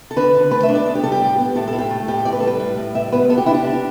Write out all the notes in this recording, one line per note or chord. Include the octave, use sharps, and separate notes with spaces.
A4
D3 B4
D3
A3 B4
E5
D4
D5
B3 A4
G4
G3 A4
G4
A2
B3
A2 A4
A4
A2
G4
A3
A2 G4
A2 D5
B4
A4
G3 B4
A2
A2
G3 E5
B3 B4
B3 A4
G4
D4 E4
G4
D4